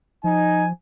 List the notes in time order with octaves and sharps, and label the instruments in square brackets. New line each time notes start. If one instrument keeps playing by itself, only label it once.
[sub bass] F3 [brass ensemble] D#4 [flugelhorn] G#5